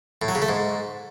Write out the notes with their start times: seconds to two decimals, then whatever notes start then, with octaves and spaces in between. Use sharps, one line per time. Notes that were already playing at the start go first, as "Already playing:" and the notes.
0.22 A2
0.28 F#3
0.35 C#3
0.42 A3
0.49 G#2